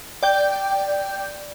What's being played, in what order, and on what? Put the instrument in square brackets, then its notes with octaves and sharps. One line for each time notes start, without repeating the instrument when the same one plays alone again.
[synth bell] D5 G5 G6